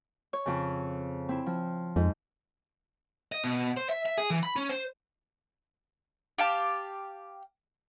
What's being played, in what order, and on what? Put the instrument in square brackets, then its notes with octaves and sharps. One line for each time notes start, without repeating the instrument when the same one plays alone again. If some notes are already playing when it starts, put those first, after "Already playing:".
[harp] C#5
F2 C#3
C4 E4
F3
[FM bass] F2 [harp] G#2
[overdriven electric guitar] D#5
B2
C5
E5
E5
G#4
E3
B5
C#4
C5
[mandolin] G4 F5 A5